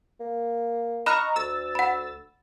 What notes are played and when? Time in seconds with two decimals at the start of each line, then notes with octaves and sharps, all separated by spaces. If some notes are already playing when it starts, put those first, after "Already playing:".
0.20 A#3
1.06 D#5 A#5 B5 C#6 F6 F#6
1.36 D2 E6 A6
1.75 F#5 B5